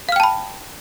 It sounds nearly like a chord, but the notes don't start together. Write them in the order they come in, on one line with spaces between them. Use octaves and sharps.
F5 F6 G5 A5 B5